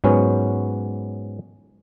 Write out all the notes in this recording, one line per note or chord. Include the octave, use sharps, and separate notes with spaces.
G#2 F#3 B3 C#4